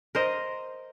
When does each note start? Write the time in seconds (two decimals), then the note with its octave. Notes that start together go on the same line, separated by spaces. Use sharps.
0.15 A#4 C5 D#5